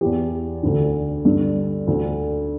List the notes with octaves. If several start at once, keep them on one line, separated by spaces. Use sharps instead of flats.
E2 E3 G4
D2 D3
G2 D3
D2 D3